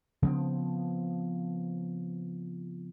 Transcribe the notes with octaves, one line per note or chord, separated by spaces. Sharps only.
C#3 F3 B3 C4